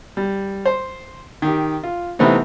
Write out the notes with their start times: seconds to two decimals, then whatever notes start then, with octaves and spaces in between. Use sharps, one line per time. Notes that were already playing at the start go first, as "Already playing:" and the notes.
0.17 G3
0.66 C5
1.42 D#3 G4
1.83 F4
2.19 C3 E3 A3 B3 C4 D#4